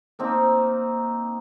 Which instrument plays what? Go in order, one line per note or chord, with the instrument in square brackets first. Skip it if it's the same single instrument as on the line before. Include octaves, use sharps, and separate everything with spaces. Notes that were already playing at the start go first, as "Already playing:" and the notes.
[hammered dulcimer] A#3 C4 D#4